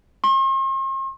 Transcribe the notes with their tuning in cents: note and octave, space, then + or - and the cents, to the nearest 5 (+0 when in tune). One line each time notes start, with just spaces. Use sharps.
C6 +45